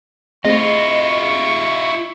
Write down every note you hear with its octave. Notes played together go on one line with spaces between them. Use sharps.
A3 C4 E4 F4 G#4 D#5 C#6